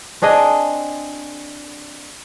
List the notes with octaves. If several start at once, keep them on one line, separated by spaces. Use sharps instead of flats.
C4 D4 G#4 D#5